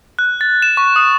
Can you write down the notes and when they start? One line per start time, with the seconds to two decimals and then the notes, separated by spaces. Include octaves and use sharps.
0.19 F#6
0.41 A6
0.62 E7
0.77 C#6
0.96 D#6